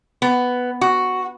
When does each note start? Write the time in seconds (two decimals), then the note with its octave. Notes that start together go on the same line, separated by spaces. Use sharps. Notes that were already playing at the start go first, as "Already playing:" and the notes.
0.22 B3
0.81 F#4